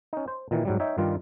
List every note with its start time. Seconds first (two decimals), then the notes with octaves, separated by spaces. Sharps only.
0.13 C#4 D#4
0.28 C5
0.51 A#2 D#3 E3
0.65 G#2 F#3 G3
0.80 D#4 C#5 E5 G5
0.98 G2 D#3 G3 F4